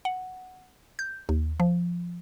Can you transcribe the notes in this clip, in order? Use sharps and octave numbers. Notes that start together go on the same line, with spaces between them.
F#5
G6
D#2
F3